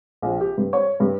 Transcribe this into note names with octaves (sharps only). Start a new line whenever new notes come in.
A#1
G4
G2
C#5
G2